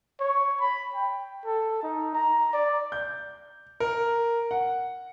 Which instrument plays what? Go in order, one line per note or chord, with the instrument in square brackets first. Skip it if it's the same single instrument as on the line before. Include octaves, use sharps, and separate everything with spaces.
[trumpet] C#5
B5
G5
A4
D#4
A#5
D5
[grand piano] G6
A#4
F#5